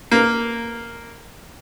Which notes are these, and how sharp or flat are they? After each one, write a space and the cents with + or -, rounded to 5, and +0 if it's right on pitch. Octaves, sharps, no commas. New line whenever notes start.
A#3 -5 B4 +0